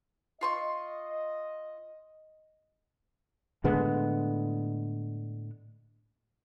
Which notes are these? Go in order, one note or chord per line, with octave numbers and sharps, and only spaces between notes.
F4 D#5 C6 C#6
A2 D3 G#3 B3